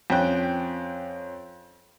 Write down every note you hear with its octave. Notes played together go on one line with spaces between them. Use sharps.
F2 C#4 G5 F#6